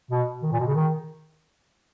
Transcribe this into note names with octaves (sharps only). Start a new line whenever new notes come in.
B2
D#3
A#2
B2
C#3
D#3